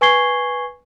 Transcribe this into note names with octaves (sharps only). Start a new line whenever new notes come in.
B4 G#5 C#6 G#6 C7 G7